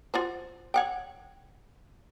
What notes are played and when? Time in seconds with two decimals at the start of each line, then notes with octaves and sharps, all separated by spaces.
0.14 F4 F#4 C5
0.74 C#5 F#5 G5